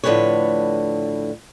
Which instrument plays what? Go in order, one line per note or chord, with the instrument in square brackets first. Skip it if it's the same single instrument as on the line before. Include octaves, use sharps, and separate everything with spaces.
[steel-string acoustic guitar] A2 D3 F3 G#3 B4 C#5